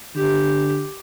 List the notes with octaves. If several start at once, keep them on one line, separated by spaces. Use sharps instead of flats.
D3 G4